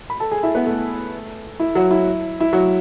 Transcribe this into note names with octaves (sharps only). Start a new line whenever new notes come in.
B5
A4 A5
G#4 G#5
E4 E5
B3 B4
A3 A4
E4
F#3 F#4
E4
E4
F#3 F#4